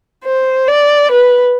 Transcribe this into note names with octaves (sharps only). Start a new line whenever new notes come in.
C5
D5
B4